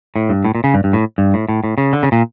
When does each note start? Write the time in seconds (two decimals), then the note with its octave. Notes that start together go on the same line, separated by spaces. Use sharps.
0.16 A2
0.29 G2
0.44 A2
0.55 A#2
0.64 C#3
0.74 G2
0.84 G2
0.93 A2
1.18 G2
1.34 A2
1.49 A2
1.64 A2
1.78 C#3
1.93 D3
2.03 C#3
2.12 A#2